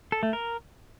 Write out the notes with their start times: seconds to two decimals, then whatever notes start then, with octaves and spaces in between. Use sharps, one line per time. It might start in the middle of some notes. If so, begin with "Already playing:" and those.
0.12 A4
0.23 A3
0.33 A#4